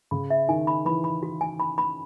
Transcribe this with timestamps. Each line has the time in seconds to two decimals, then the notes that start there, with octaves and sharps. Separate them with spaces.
0.11 C#3 B5
0.30 E5
0.49 D#3 G#5
0.67 B5
0.85 E3 B5
1.04 B5
1.23 F#4
1.41 G#5
1.60 B5
1.78 B5